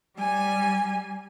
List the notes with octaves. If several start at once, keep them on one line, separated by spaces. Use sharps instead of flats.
G3 G#5